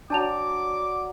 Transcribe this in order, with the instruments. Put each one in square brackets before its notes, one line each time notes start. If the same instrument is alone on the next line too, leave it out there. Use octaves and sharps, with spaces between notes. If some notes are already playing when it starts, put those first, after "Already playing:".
[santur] F#3 D5 [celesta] D4 A5 F7 [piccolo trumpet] D6